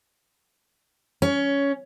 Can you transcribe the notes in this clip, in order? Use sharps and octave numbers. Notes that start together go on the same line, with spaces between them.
C#4